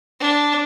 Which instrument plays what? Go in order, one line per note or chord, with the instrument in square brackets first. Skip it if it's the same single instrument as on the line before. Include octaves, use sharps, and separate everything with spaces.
[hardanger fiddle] D4